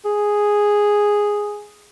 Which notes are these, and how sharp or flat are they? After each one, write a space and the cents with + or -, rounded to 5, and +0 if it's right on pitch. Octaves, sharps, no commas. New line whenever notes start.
G#4 -5